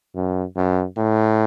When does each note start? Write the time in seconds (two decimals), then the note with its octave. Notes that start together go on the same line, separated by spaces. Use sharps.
0.15 F#2
0.56 F#2
0.97 A2